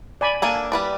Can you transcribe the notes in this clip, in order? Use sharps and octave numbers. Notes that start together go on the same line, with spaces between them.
D5 G#5 B5
A#3 D4 A4 G#5
G3 B4 D5